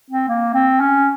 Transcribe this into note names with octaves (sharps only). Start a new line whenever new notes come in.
C4
A#3
C4
C#4